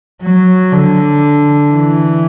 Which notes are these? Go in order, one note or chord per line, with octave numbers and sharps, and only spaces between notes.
F#3
D3
E3